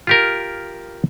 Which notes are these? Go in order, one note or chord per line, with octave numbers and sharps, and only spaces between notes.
F4 G4 A#4